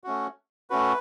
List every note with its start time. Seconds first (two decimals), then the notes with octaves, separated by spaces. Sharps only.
0.04 A3 C#4 F#4
0.70 A3 C#4 F#4 B4